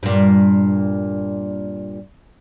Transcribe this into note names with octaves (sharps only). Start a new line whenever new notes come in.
G2 A#2